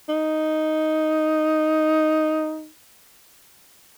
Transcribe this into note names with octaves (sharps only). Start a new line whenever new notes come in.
D#4